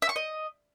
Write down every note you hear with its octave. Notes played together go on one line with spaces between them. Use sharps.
E5
C#6
D#5